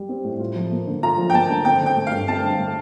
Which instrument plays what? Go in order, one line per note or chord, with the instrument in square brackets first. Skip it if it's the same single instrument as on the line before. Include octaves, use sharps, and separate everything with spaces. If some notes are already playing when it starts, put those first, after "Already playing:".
Already playing: [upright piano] G3
C4
A2
F4
F3
A#3
D3
[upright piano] F4 [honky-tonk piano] A#5
[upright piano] F3
[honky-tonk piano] G5
[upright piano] A#3 [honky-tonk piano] A5
[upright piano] D3
[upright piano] C4 [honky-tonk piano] G5
[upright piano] D3
[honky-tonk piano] G5
[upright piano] A3
[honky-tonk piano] F5
[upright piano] G2
[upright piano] C4 [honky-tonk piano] A5
[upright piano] D3
A3